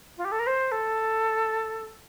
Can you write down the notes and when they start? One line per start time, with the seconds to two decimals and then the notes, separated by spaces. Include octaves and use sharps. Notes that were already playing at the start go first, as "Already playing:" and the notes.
0.17 F4
0.24 G4
0.31 A4
0.39 A#4
0.46 C5
0.71 A4